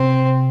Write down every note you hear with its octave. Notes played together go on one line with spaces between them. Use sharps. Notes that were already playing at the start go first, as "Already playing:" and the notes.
Already playing: C3 C4